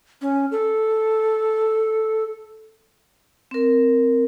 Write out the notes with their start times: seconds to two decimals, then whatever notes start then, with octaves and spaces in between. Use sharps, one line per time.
0.22 C#4
0.51 A4
3.51 C4 A#4